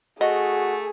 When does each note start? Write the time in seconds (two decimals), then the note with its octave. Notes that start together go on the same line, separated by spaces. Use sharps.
0.21 A3 F#4 G#4 D#5